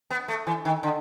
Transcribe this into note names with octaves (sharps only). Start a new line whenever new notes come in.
B3
A3
E3
D#3
D3